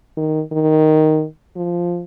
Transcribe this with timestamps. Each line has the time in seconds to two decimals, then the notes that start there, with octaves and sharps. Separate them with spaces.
0.17 D#3
0.52 D#3
1.56 F3